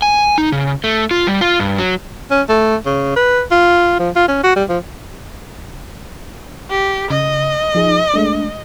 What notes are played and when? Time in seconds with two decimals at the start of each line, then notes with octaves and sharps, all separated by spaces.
0.02 G#5
0.38 D#4
0.52 C#3
0.84 A3
1.11 F4
1.27 G3
1.41 F4
1.60 G2
1.78 F#3
2.31 C#4
2.49 A3
2.86 C#3
3.16 B4
3.51 F4
3.99 F3
4.16 F4
4.28 C#4
4.43 F#4
4.56 G3
4.69 F3
6.70 G4
7.10 C#3 D#5
7.75 F3 D#4 G#4
8.14 G#3 A3 D4